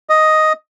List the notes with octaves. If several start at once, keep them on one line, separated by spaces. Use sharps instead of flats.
D#5